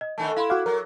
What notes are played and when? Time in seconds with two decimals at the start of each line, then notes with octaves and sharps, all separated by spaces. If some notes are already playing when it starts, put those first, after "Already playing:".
0.01 D#5
0.18 D3 D#3 A3 G#5 A5
0.36 E4 F5 B5 C6
0.50 F#4 F5 D6 F#6
0.66 F#3 A#4